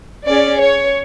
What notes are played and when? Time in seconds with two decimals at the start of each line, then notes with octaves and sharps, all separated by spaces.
0.27 C#4 G#4 D5
0.60 C#5